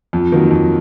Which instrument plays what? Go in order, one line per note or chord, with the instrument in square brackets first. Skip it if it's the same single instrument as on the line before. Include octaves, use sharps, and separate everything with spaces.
[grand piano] F2
D#3 F#3 A#3
F2